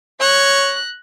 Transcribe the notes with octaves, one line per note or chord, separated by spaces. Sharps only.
C#5 F#6 A#6